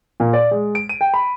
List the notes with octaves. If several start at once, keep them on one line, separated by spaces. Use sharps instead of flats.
A#2
D5
G#3
D7
D#7
G5
B5